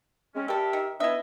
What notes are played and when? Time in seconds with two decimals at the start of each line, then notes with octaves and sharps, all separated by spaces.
0.35 G#3 C4 C#4
0.48 G3 G4 A4 A#4 E5
0.73 D#3
1.00 B3 D4 E4 D#5 E5